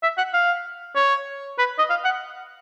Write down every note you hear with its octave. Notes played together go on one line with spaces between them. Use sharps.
E5
F#5
F5
C#5
B4
D#5
F5
F#5